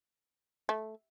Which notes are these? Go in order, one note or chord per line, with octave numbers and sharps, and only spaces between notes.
A3